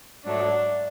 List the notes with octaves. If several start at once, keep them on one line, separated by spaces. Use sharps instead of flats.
G#2 F#3 A3 D4